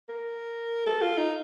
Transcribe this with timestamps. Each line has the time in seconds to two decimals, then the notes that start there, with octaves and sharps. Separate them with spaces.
0.09 A#4
0.86 A4
1.01 F4
1.17 D#4